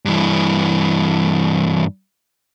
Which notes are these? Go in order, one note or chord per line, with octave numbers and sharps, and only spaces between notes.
G2 E3